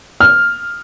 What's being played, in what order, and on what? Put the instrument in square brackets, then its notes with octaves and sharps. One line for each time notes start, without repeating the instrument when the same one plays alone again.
[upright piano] F6